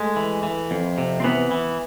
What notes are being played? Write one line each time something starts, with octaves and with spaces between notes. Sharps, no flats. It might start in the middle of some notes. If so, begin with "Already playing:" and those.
Already playing: G#3 A3
E3
E3
F2
C3
C4
E3 B3
E3